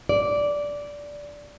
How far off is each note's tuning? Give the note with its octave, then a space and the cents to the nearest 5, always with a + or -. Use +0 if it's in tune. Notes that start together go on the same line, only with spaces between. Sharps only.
D5 -10